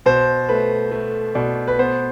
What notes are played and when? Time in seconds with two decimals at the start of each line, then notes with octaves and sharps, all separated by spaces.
0.06 B2 C5
0.49 A3 B4
0.91 A3
1.35 B2 D5
1.68 B4
1.79 B3 C5